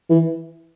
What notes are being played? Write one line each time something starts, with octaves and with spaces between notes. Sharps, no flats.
E3